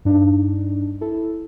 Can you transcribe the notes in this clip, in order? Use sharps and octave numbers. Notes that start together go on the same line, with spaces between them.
G2 D4 D#4
E4 A4